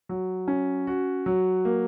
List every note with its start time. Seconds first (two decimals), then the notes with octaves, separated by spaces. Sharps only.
0.09 F#3
0.48 C#4
0.87 F#4
1.26 F#3
1.65 A#3